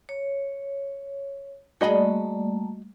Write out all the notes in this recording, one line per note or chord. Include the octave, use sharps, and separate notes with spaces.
C#5
G3 A3 A#3 D4 F#4 G#4 D#5 B5